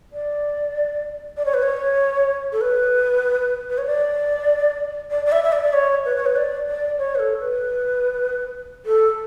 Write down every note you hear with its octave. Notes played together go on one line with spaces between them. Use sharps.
D5
D5
C#5
B4
C#5
A4
B4
B4
C#5
D5
D5
D5
E5
E5
D5
D5
C#5
B4
C#5
B4
D5
D5
C#5
B4
A4
B4
A4